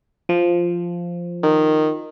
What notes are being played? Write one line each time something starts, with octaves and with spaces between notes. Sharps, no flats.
F3
D#3